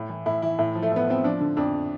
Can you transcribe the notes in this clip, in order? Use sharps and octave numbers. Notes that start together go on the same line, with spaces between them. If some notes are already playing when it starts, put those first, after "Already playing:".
Already playing: A2
E3
A2 E4
E3 E4
A2
F3
A3
A2 B3
F3 C4
F3 D4
D3
F2 D4